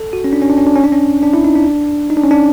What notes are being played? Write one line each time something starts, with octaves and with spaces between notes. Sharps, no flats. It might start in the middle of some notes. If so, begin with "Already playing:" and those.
Already playing: A4
F#4
C#4
D4
C#4
D4
C#4
D4
C#4
D4
C#4
D4
E4
D#4
D4
D#4
D4
C#4
D4